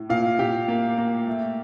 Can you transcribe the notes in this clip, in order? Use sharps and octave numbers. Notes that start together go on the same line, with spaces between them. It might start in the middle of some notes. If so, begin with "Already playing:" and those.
Already playing: A2
A#2 F5
A#2 G4
A#3
A#3
A3